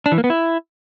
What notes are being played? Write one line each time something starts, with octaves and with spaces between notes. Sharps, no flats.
D4
E3
A#3
B3
E4